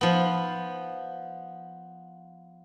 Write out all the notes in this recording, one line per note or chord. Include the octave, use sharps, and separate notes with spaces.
F3 B3